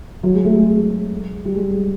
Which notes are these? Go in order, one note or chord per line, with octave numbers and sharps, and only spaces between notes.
F#3
G#3
A3
G#3
G3
G#3